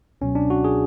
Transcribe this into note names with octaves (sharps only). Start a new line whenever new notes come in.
C#2 B2 F#3 C#4
D4
F#4
G#4